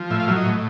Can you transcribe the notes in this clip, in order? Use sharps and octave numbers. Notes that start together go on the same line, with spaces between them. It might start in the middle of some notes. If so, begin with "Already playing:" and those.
Already playing: F3
A2 E5
F5
F#3 E5
D#5
A2